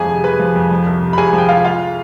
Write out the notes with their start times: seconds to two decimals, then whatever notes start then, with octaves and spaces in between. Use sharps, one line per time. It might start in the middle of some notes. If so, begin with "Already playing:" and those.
Already playing: F2 F3 G#4 G#5
0.09 C3
0.23 G#3 B4 B5
0.39 F3
0.56 F2
0.71 F3
0.86 C2
1.02 C3
1.13 B5
1.18 C2 G#4 G#5
1.33 F3
1.38 G5
1.49 C2 F4 F5
1.64 G#3 F4 F5